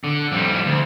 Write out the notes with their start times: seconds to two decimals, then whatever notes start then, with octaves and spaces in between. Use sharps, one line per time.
0.04 D3
0.32 F2 G3
0.66 D2